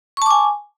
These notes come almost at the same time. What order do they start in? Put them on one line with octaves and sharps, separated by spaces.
C#6 A5 D6 G#5